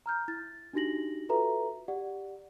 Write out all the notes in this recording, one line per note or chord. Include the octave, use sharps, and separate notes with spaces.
A#5 F6 G6
E4 A6
D4 D#4 F#4 G4 A#6 F#7
F4 F#4 A4 B4 E5 A#5
G4 D5 F#5